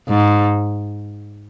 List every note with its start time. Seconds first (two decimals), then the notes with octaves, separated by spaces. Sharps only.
0.09 G#2